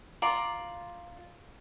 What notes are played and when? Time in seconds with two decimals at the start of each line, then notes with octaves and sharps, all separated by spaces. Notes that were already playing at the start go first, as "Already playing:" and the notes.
0.22 F4 D5 A#5